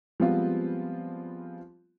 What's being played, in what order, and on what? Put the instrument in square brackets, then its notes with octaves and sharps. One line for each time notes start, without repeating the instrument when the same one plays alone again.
[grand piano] F3 G3 G#3 B3 C4 F4